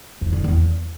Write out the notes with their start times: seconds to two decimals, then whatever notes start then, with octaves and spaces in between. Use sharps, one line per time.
0.21 F2
0.33 D3
0.44 E2